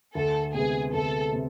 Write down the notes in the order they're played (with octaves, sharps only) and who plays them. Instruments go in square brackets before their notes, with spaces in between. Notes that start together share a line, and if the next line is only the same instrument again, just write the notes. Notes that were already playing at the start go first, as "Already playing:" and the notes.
[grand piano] D2 [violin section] A4
[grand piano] C3 G#3 B3 [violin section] G#4
[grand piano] D2 [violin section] A4
[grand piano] C3